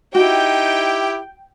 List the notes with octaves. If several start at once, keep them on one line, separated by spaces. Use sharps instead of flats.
D#4 E4 F#4 G4 G5